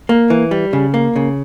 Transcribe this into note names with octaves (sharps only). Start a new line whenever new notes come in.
A#3
E3
G3
C#3
A#3
C#3